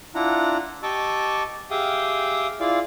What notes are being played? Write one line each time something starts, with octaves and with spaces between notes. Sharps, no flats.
D4 E4 F4 F#5 A#5
G4 D#5 A5 C#6 D6 E6
G4 G#4 E5 F5 G5 D#6
E4 F4 G#4 D5 F5